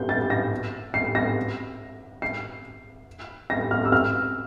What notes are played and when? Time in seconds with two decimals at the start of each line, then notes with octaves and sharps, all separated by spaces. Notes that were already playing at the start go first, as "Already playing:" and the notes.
Already playing: G6
0.09 A6
0.30 A#6
0.94 C7
1.15 A#6
2.22 C7
3.50 A#6
3.71 F6
3.85 E6
3.92 F6